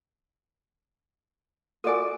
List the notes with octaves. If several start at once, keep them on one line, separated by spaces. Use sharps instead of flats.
F4 F#4 A4 A#4 D5 G#5